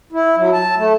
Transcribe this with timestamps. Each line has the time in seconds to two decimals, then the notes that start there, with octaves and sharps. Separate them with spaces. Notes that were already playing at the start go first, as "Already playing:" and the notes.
0.12 E4
0.37 F#3
0.53 A5
0.77 A3